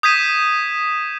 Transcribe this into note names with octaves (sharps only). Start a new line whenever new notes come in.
D#6 G6 G#6 B6 D#7 E7